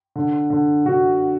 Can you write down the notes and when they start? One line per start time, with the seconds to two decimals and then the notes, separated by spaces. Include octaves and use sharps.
0.16 D3
0.50 D3
0.86 D3 F#4